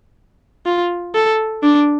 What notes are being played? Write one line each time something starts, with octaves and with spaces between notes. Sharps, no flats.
F4
A4
D4